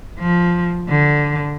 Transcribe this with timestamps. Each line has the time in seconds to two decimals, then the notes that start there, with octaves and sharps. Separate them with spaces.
0.20 F3
0.89 D3